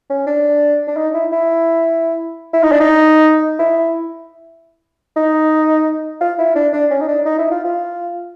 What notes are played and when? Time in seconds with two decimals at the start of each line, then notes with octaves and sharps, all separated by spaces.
0.10 C#4
0.27 D4
0.88 D4
0.96 D#4
1.14 E4
1.32 E4
2.54 E4
2.63 D#4
2.72 D4
2.80 D#4
3.59 E4
5.16 D#4
6.21 F4
6.38 E4
6.56 D4
6.73 D4
6.91 C#4
7.01 D#4
7.08 D4
7.25 D#4
7.39 E4
7.51 F4
7.64 F4